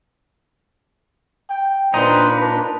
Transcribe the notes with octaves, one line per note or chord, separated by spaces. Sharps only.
G5
A#2 D4 D#4 B4 C5
A5